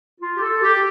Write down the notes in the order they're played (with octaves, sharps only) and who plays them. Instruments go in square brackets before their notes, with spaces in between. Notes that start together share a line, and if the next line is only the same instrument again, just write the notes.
[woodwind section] F4
G4
A4
G4